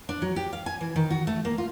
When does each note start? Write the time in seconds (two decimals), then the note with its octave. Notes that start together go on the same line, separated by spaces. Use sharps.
0.09 D4
0.22 F#3
0.36 G4
0.53 F5
0.66 G#5
0.81 E3
0.96 D#3
1.10 F#4
1.27 A3
1.45 A#3
1.58 F4